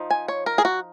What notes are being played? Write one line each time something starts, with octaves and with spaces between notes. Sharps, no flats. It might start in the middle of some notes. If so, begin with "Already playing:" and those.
Already playing: F3 D#4
G#5
C#5
A#4
G#4
F#4